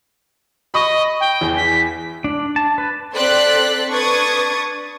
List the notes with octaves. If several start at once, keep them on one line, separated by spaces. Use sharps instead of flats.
D#5 B5 C#6 D#6
G5
E2
B6
D4
A5
B4
C4 A4 D5 C6 F#6 B6
D4 B4 C#6 D#6 G#6 A6